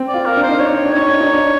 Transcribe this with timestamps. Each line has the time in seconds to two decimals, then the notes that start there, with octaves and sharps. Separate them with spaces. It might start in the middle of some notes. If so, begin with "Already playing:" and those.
Already playing: C4
0.08 D5
0.14 F4
0.25 A#4
0.37 D4
0.43 C5
0.49 D#4
0.59 D4 C#5
0.73 D#4
0.85 D4
0.94 D#4 C#5
1.09 D4
1.21 D#4
1.33 D4